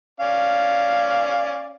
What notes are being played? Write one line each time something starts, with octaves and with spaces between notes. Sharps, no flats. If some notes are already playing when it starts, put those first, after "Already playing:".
C#4 D5 F5